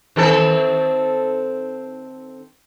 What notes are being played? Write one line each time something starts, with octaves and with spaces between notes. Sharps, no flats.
D#3 C4 A4